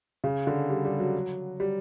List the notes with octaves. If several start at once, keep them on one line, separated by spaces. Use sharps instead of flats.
C#3
D3
G3
G3
F#3
G3